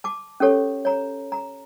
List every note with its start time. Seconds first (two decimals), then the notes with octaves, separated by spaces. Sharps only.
0.04 A5 D6
0.40 C#4 G4 A4 C#5
0.85 C#5 A#5
1.32 A#5